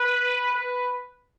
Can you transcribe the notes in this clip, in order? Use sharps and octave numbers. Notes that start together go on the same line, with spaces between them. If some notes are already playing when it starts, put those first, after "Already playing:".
Already playing: B4
B4